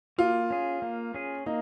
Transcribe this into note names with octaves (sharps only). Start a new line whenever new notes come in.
A#3 F4
C#4 G#4
A#3
C#4 G#4
A#3 D#4